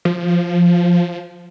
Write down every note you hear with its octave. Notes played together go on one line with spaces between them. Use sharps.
F3